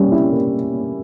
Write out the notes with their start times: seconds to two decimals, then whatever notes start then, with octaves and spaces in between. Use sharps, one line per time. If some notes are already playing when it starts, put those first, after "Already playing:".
Already playing: G3 A#3 C#4
0.12 E4
0.33 A#3